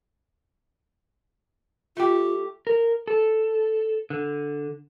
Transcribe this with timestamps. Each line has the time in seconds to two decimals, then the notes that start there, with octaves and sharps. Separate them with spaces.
1.97 A3 F4 G4
2.67 A#4
3.08 A4
4.10 D3